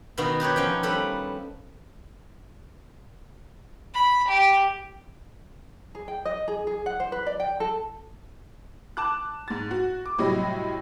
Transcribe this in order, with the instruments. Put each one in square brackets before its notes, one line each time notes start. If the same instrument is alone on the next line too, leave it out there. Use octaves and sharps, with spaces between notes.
[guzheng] B2 D#3 B3 F#4
D#4 G4 B4 C#5
F3 C#4 C#5 G5
G3 A4 B4 B5
[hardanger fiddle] B5
G4
[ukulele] G#4
G5
D#5
G#4
G#4
F#5
C5
B4
D5
G5
A4
[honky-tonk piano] A5 D6 F#6
G#2 A6
F#4
D6
A2 C3 F#3 G3 D#5